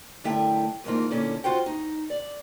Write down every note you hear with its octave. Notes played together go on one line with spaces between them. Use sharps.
F#2 D3 A3 E4 E5 G5
D2 G#2 E3 A#3 D#4 F4
A#2 D3 C#4 E4
F4 F#4 C5 G5
D#4
D5